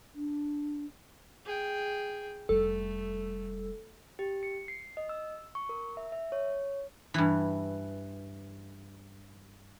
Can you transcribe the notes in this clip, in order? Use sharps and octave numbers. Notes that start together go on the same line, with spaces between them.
D4
G#4 G5
F1 G3 A3 A4
G4
C#7
C7
D#5
E6
C#6
A#4
E5
E5
C#5
G2 E3